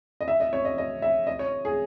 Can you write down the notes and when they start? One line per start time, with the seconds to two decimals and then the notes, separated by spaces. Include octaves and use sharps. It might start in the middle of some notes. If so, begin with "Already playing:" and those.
0.21 D#5
0.28 E5
0.40 D#5
0.53 C#5
0.65 D#5
0.78 D#5
1.02 E5
1.27 D#5
1.39 C#5
1.65 G#4